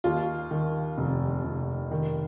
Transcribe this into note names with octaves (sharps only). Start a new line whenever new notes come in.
D#2 F4
D#3
F1
F1
D#3